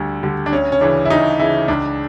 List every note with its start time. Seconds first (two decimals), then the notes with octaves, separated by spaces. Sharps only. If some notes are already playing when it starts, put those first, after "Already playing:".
Already playing: D2 D3 G3
0.23 D3 G3
0.46 D4
0.52 D2 C#4
0.72 C#4
0.81 C#3 E3 D4
1.05 E4
1.10 D2 D#4
1.39 C#3 E3 E4
1.68 C#2 D4